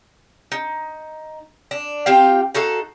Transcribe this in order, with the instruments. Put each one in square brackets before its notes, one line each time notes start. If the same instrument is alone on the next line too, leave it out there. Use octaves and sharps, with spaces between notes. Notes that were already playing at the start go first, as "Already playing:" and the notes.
[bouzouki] D#4
D4
C4 F4 G4 F5
D#4 F#4 A4 F5